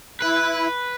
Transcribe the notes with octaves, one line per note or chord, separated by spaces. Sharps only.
E4 B4